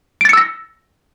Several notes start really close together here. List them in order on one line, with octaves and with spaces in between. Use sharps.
D7 A6 C#7 E6 A#6